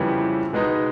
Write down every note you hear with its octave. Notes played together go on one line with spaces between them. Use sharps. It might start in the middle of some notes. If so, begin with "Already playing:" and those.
Already playing: F2 C#3 E3 G3 B3
B2 G#3 B3 D#4